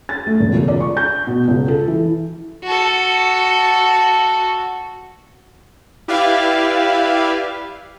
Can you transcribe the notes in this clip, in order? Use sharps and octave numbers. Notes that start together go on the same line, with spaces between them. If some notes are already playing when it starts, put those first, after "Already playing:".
A6
A3
E1
C#2
D5
C#6
G6
B2
C#2
A4
E3
F#4 A4
E4 G4 B4 D5 E5 F5